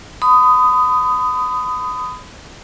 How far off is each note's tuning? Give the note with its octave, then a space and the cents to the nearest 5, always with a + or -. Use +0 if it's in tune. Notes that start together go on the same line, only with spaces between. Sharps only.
B5 +35 D#6 +0